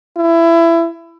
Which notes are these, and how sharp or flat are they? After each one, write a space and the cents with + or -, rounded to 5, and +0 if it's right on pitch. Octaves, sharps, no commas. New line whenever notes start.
E4 +20